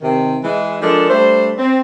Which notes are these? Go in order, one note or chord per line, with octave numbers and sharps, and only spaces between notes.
C3 D#3
E3 G#3
F3 G#3 D4 A4 A#4
G3 A3 D4 C5
C4